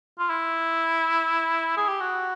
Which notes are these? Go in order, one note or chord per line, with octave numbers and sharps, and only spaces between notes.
F4
E4
G#4
G4
F#4